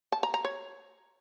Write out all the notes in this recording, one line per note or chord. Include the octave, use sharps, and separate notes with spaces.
A5
A#5
A#5
C#5